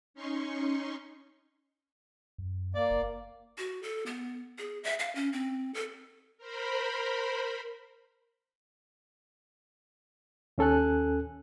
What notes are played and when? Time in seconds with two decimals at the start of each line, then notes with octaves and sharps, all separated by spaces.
0.14 C#4 D#4 C6 C#6
2.38 F#2
2.75 A#3 D5
2.91 F#1
3.58 F#4
3.83 A4
4.06 B3
4.58 G#4
4.84 E5
4.99 F5
5.15 C#4
5.33 C4
5.74 A4
6.38 A#4 C5 B5
10.58 D#2 C#4 A4 G#5 F#6